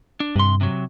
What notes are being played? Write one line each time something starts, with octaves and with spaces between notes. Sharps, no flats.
D4
G2 C3 C6
C3 F#3